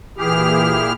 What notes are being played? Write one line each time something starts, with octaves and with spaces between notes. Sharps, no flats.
A#2 E3 E4 G4 G#4 F6